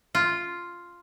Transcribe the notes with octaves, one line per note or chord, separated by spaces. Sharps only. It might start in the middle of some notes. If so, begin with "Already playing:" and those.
F4